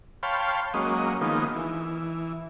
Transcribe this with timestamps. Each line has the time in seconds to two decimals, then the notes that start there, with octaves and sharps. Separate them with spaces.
0.23 C#5 F5 G5 A5 B5 C6
0.74 F#3 G#3 A#3 C#4 D#5
1.21 D#3 F3 G#3 A#3 B3 D#4
1.55 E3